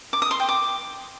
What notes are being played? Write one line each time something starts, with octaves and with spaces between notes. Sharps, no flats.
D6
D#6
C6
G5
D6